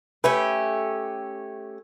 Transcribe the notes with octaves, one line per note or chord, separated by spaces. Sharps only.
A3 C#4 G4 B4